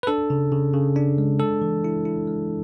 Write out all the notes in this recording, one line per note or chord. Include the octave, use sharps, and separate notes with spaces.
B4
D4 A4
C#3
C#3
C#3
D4
G#3
G#3 A4
E3
E4
E4
G#3